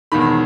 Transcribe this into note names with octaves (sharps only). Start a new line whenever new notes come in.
E1 E2 D#3 B5